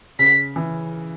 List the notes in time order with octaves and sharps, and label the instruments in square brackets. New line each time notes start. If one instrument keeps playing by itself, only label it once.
[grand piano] C#3 [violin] B6
[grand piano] E3